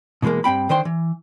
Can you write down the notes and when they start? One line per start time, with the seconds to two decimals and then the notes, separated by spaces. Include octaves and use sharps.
0.22 B2 E3 F3 G#3 A#3
0.44 G2 C4 G5 B5
0.69 D3 D#3 C5 G5 C6
0.85 E3